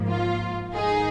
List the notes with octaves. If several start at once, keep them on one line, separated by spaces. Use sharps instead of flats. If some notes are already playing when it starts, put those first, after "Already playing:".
Already playing: G#2 F3 A#3
F4
G#2 D#3 G#3 D#4 G#4